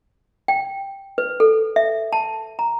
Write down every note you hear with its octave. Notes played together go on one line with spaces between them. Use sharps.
G5
B4
A4
E5
A5
A#5